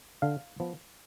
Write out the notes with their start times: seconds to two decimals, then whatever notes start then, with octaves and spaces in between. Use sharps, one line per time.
0.22 D3 F5
0.60 F3 B3